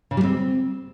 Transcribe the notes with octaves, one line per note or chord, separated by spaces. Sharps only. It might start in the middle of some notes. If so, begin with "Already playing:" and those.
C#3
G3
C4